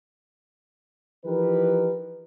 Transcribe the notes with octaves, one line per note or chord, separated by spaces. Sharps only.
E3 F3 D#4 G4 A#4 B4